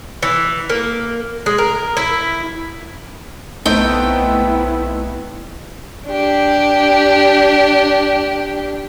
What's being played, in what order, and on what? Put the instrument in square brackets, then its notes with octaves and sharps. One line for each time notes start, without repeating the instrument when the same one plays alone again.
[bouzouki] E3
A#3
G#3
A#4
E4
[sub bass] B1 [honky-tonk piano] A3 C4 D#4 [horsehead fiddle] B3 E4 [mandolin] G5 D#6
[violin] D4 G4